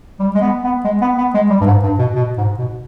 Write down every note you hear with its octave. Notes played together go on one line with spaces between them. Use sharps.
G3
G#3
B3
B3
G#3
B3
B3
G#3
G3
G2
G#2
G2
B2
B2
G#2
B2